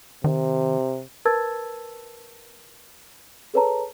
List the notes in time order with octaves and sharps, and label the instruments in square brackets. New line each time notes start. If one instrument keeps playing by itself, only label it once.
[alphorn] C3 [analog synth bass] D#3
[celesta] A#4 B4 A5 E6 G#6 A6
G#4 A4 B4 C#5 A5 A#5